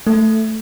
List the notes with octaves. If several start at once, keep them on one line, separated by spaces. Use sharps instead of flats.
A3